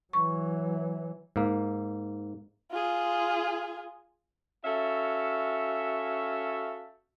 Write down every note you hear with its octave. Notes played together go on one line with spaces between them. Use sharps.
E3 F#3 C#6
G#2 A#3
F4 G#4
C#4 F#4 A4 E5 F5